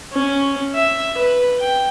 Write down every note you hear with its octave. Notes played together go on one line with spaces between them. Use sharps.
C#4
E5
B4
G5